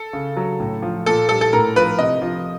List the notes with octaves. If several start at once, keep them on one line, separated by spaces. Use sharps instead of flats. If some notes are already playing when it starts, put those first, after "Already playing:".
Already playing: A4
C#3
F#3
A2
F3
A#2 A4
G3 A4
A4
A2 A#4
F3 B4
C3 D#5
F3